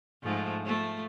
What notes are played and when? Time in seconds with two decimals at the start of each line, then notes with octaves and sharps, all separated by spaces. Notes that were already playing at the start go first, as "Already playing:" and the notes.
0.23 G#2 F3 A3
0.62 F3 A3